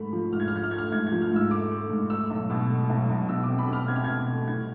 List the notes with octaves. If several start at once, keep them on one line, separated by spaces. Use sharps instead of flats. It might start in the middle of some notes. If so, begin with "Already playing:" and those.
Already playing: G#2 A3 B5
F3
G#2 F6
G#6
F6
F3 G#6
F6
A3 G#6
F6
G#2 G#6
F3 G#6
F6
G#2 E6
A3 D6
A3
G#2
A3 E6
B1
B2
A3
B1
B1
B2 E6
D6
C4
B5
B2 F6
C4 G#6
F6
B2 G#6
A3
C2 G#6